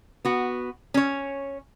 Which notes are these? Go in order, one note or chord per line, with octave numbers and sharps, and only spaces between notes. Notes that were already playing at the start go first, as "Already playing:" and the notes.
B3 F#4
C#4 C#5